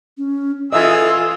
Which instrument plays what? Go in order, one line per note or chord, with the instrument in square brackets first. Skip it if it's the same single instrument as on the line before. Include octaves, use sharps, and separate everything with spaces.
[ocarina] C#4
[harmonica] E3 G#4 E6 [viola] F4 [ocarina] A4 [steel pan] D#5 E5 G#5